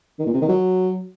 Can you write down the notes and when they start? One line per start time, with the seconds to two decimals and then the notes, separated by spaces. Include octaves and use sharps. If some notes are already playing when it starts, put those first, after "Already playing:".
0.19 D#3
0.27 A#2
0.34 C3
0.41 D#3
0.49 F#3